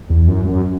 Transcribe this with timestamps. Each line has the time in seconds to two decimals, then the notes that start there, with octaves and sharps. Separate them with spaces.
0.10 E2
0.28 F#2
0.45 F#2